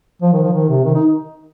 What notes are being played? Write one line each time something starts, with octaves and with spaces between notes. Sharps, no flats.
F3
D#3
F3
D#3
C3
D#3
D#4